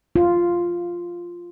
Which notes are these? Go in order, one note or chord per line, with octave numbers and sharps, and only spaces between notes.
F4